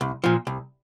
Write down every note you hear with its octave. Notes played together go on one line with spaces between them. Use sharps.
C2
A#2 F3
C2